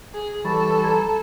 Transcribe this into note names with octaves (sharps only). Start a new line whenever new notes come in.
G#4
E3 G3 A4 B5 C#6 A6
A#5 B5 G#6